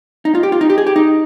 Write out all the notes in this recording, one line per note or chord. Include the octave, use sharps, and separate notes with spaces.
D#4
F4
G4
F4
D#4
G4
G#4
G4
D#4